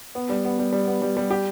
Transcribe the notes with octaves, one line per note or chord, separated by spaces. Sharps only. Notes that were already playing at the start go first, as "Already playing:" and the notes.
B3
G3
B3
G3
G3
B3
G3
G3
G4